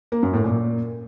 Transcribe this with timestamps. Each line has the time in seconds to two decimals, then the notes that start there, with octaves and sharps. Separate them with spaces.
0.12 A#3
0.23 F#2
0.33 A2
0.44 A#2